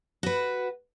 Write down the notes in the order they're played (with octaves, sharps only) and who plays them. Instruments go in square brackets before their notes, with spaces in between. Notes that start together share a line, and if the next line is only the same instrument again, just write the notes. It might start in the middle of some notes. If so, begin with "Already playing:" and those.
[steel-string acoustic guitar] F#4 B4